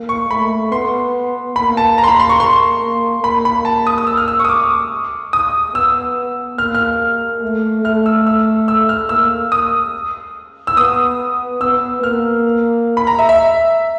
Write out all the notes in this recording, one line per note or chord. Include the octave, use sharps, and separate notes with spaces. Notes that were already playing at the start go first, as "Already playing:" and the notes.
Already playing: A#3
C#6
A3 B5
B3 C6
A#3 B5
A5
A#5
C6
B5
C6
C#6
C6
A#3
A#3 B5
B5
A5
D#6
D#6
E6
F6
E6
C#6
D#6
D6
D#6
B3 E6
A#3 F6
F6
A3
A3 F6
E6
E6
E6
F6
A#3 E6
D#6
E6
B3 D#6
B3 E6
A#3 F6
B5
A#5
E5
E5